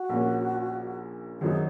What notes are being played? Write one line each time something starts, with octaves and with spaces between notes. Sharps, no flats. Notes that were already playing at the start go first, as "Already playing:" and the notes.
Already playing: F#4
A#1 A#2 A#3 C#4
G#1 F#2 F#3 D#4 G#4